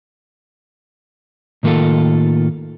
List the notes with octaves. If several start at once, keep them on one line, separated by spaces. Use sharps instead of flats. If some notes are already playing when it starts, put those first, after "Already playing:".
A2 D#3 A#3 F4 A4